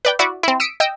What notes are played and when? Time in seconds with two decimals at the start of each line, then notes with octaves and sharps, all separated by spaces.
0.05 B4 D5 G5
0.19 E4 F#4 D5
0.43 C4 E4
0.60 D#6 E6 B6 C#7 D7
0.80 D#5 G5 E6